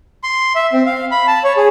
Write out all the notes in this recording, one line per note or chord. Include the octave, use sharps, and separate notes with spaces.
C6
E5
C4
F5
B5
A5
C#5
G#4